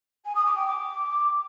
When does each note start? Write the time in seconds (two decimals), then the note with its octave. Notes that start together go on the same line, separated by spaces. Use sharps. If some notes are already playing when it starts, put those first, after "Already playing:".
0.25 G#5
0.35 D#6
0.45 D6
0.55 G5
0.66 D6